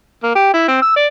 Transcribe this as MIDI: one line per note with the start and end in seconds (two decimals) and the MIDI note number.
0.23 0.31 58
0.36 0.49 67
0.54 0.67 64
0.68 0.77 60
0.82 0.94 88
0.97 1.06 74